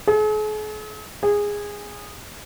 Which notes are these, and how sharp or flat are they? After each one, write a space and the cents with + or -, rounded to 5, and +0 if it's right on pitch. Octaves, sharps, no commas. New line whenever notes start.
G#4 +45
G#4 -15